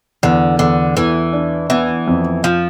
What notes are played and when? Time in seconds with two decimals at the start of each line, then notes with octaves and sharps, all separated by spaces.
0.23 E2 D3
0.59 E2 D3
0.97 E2 E3
1.33 D4
1.70 E3 B3
2.08 F2
2.44 F3 F4